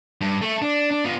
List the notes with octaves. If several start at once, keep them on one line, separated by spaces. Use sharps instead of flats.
G2
A3
D4
D4
B3 F4